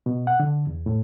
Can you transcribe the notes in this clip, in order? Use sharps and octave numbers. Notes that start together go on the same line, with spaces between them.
B2
F#5
D3
E2
A2